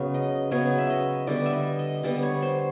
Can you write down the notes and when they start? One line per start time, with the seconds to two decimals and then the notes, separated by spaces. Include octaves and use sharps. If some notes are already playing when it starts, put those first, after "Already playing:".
Already playing: C#3 F#3 B3
0.14 D#5
0.51 C#3 F#3 B3 C#5
0.78 E5
0.90 D#5
1.27 D3 G3 B3 D5
1.46 E5
1.53 D#5
1.79 D#5
2.03 D3 G3 B3 D5
2.23 C#5
2.42 C5